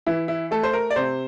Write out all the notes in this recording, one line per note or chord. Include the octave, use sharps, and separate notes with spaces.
E3 E4
E4
A3 A4
C5
A#4
D5
C3 C5